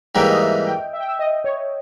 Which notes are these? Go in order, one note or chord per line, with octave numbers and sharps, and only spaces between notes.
G#2 E3 G3 A#3 G5
D#5
E5
G5
E5
G5
E5
D#5
C#5